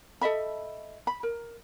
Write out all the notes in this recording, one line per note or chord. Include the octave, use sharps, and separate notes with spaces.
A4 D#5 E5 B5
B5
A#4